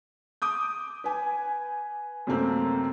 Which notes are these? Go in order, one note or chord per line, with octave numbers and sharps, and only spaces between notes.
D6 D#6 G6
B4 G#5
F#2 C3 A3 A#3 C4